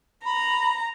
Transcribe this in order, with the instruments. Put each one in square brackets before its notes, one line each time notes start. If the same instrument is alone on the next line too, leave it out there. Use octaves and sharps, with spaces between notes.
[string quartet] A#5 [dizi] B5